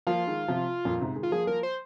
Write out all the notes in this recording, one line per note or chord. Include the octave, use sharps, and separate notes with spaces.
F3 A#3 F4
D#3 G#3
C3 F3
F2 A#2
G#2 C3
D#3 G#3
F4
F3 A#3 G#4
F3 A#3 A#4
C5